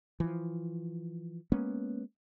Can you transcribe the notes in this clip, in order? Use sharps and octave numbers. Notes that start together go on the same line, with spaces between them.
E3 F3
G#3 A#3 B3 C#4